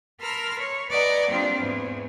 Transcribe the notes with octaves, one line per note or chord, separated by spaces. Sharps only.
A#4 A5 B5 C6 E6 F6
C#5
B4 D5 D#5 F#5 G#5 A#5
F#3 G3 A#3 C4 D4 F4
E2 G#2